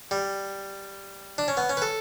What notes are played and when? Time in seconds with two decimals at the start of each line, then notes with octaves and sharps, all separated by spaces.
0.11 G3
1.38 D4
1.48 C#4
1.57 B3
1.69 C#4
1.77 B4
1.82 A4